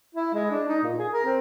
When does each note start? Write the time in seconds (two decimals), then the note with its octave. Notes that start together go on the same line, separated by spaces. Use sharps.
0.15 E4
0.34 G#3
0.50 D4
0.68 D#4
0.84 A#2
0.98 G#4
1.12 A#4
1.25 C4